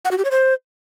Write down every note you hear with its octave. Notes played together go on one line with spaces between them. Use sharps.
F#5
F#4
G4
C#5
C5